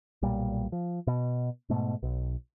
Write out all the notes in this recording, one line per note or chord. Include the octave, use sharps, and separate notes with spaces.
B1 A#2 G3
F3
B2
G#2 B2 A3
B1